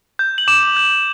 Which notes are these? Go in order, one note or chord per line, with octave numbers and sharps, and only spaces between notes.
G6
F#7
D6 E7
G6